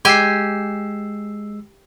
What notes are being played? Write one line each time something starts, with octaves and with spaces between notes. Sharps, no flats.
G#3 G4 G5 G#5 E6 C7